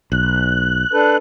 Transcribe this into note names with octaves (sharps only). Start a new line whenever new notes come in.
B1 F#6
D4 A4 B4